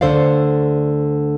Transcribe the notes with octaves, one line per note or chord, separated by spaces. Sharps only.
D2 D3 A4 C5 D5 F5